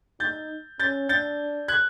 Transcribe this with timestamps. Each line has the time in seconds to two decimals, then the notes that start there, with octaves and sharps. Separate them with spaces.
0.20 D#4 G6 A6
0.80 C#4 G6 A6
1.09 D4 G6 A6
1.68 F#6 G#6